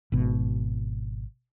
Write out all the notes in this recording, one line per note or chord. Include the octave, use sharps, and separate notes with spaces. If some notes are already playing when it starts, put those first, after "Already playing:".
G#1 B2